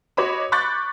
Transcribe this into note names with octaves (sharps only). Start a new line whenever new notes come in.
F#4 C#5 D#5 B5 D6
B5 C#6 D6 F#6 G6 A6